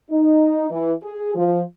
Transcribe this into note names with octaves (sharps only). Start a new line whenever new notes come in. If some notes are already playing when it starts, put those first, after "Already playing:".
D#4
E3
G#4
F3